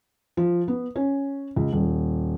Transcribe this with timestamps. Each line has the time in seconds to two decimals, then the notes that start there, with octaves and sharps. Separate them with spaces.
0.37 F3
0.68 B3
0.96 C#4
1.56 C#2
1.72 D#1